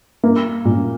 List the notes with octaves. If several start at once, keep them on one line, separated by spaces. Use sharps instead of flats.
A#3
A#2